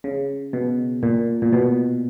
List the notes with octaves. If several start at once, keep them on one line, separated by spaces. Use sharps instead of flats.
C#3
B2
A#2
A#2
B2